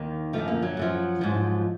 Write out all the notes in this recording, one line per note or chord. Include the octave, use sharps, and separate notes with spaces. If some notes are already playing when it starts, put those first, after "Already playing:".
Already playing: D#2 D#3
F#2 D3 F3 A3
A#3
F#3
F#2 D3 F3
G#2 F3